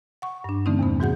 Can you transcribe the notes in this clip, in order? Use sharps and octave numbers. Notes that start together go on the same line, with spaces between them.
F#5 C#6
G2 D4
D3 E3 A3 C4 C#4 D#4
E2 C3 B3
G#2 E3 F#4 G#4 F#5 G6